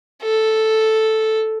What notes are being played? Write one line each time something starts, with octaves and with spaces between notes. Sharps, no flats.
A4